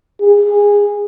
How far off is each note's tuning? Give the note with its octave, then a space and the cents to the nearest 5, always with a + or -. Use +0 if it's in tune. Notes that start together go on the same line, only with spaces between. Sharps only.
G#4 -20